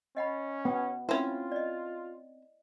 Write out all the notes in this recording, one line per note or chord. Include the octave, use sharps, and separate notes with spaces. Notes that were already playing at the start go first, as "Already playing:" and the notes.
C#4 D#5 F#5 B5
B3
C4 C#4 E4 F4
D5 D#5